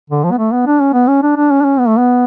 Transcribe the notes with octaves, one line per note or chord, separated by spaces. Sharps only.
D3
F3
B3
A3
B3
D4
C#4
B3
C#4
D4
D4
C#4
D4
C#4
B3
A3
B3